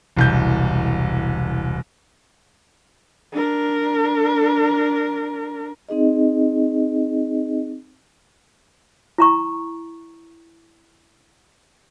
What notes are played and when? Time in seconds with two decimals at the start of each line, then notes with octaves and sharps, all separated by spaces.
0.16 E1 C2 G6
3.32 D4 A#4
5.89 C4 D#4 G#4 D#5
9.18 E4 A#5 C#6